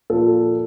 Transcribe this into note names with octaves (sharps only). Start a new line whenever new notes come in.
A#2 F3 A4